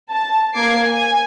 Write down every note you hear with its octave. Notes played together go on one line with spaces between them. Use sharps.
A5
A#3 D6 G#6 C7
G#5